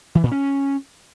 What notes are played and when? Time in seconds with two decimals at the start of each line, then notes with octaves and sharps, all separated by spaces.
0.15 E3
0.23 A#2
0.32 C#4